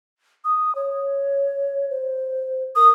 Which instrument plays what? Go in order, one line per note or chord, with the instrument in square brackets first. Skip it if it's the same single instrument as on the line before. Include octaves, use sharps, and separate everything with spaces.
[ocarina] D#6
C#5
C5
[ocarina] A#4 [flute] D#6